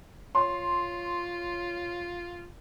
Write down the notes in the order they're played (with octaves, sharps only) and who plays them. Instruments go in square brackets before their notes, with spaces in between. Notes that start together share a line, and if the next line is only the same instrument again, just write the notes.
[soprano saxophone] F4 [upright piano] C#5 C6